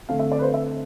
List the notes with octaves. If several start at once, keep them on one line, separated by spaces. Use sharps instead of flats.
D3 A3 C4 F5
E5
D5
B4
C5
E5